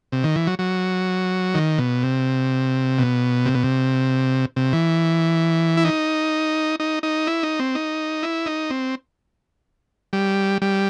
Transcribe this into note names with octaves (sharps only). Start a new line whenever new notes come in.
C3
D#3
E3
F#3
F#3
D#3
B2
C3
B2
C3
B2
C3
C3
E3
E4
D#4
D#4
D#4
E4
D#4
C4
D#4
E4
D#4
C4
G3
G3